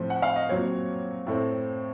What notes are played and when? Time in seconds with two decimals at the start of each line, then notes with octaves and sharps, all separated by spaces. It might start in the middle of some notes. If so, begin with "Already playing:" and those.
Already playing: A2 F3 C4 C5
0.10 F#5
0.22 F5
0.36 D#5
0.49 A#2 F#3 C4 C#5
1.27 A2 A3 C4